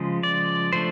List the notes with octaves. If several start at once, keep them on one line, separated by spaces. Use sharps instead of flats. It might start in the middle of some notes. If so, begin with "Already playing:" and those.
Already playing: C#3 F3 G#3
D5
F3 A3 D4 C5